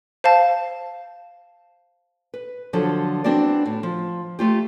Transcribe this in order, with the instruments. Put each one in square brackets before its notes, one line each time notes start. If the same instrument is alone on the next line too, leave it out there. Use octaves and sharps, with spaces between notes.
[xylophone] C5 F5 A5
[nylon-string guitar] B4
D3 F3 F#3 F4 A4
B3 C4 D4 E4 F#4 D5
A2
F3
A3 F4 G4